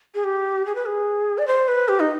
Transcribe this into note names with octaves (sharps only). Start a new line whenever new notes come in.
G#4
G4
G#4
B4
G#4
D5
C5
B4
G4
D#4